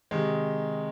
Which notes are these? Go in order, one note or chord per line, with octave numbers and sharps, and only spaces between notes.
C3 D#3 G#3